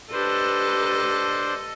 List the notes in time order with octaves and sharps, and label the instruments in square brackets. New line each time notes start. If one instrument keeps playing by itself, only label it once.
[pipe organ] D4 C5 [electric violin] G4 B4 [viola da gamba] A4 D#5